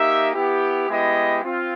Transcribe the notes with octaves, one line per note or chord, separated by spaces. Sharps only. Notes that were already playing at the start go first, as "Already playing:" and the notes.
Already playing: A#3 D#4 G4 E5
B3 E4 G4
G#3 B3 E4 G4 D#5
C4 F4